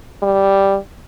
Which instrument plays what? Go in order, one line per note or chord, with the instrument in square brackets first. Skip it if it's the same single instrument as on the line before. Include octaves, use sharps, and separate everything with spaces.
[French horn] G3